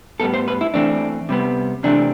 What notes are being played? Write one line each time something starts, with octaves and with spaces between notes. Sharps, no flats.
A2 G3 B3 A4
C5
B4
E4
E3 A3 C4 D4
C3 G3 B3
C3 E3 A3 C4 D4